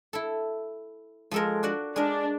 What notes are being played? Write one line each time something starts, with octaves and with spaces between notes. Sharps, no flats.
E4 A4
F3 G#3 A4 A#4
D4 F#4 D5
G#3 D4 A#4 D5